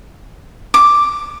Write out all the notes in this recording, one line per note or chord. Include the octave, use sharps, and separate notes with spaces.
D6